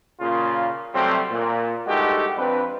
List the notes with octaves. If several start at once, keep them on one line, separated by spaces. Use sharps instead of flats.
A#2 C#3 F4
C3 F#3 G3 A3 C4
A#2
G2 G#3 A3 D#4 F#4 G4
F2 C4 D4 B4